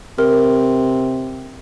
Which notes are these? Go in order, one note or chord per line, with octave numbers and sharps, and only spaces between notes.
C3 A#4